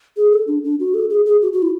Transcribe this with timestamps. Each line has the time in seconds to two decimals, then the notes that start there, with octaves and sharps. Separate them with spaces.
0.17 G#4
0.32 A4
0.48 D4
0.64 D4
0.80 F#4
0.94 A4
1.10 G#4
1.26 G#4
1.42 F#4
1.53 F#4
1.62 E4